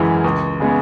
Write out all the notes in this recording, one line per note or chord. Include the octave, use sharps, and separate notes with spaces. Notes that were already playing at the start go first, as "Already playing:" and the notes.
Already playing: F#2 E3 G#3
C#2
C#3 G#3 B3